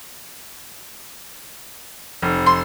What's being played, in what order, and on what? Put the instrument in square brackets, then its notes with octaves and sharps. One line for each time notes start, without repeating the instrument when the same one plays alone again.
[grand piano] F1
[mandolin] C6